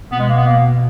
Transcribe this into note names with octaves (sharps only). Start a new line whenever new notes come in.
B2 B3
G#3
A#3
B3
A#3